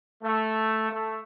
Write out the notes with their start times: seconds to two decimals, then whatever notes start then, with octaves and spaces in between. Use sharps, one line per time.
0.22 A3
0.90 A3